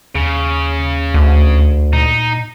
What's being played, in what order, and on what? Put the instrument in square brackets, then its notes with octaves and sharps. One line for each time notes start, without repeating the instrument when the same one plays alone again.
[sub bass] D#2 [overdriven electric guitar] C#3
[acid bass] D2
[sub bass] A#2 [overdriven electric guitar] D#4